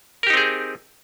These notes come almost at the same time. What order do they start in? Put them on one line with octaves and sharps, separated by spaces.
A#4 G4 D#4 C4 G#4